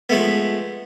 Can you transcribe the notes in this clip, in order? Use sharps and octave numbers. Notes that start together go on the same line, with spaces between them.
F3 G#3 A3 B3